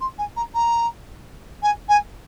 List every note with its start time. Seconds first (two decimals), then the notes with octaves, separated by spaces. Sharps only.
0.01 C6
0.18 G#5
0.36 A#5
0.54 A#5
1.63 G#5
1.89 G#5